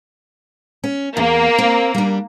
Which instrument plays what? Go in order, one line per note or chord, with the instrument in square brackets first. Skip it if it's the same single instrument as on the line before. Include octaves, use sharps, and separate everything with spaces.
[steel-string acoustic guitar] C#4
[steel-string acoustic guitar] E2 [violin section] A#3
[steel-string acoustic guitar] C4
G3 D4